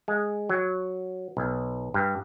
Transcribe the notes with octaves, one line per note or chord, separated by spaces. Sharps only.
G#3
F#3
B1
G2